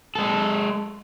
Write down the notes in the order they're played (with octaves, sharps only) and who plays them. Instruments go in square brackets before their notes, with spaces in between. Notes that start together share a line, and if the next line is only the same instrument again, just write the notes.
[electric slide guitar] G#3 A4